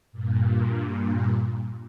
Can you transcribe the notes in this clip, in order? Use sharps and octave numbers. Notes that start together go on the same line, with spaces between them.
G2 A#2